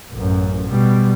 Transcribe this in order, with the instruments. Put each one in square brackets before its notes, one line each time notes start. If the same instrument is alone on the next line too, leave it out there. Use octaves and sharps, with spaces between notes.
[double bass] A1 F#2
B2 G3